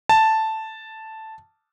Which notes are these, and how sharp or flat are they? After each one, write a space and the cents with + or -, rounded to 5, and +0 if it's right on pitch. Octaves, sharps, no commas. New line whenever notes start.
A5 +0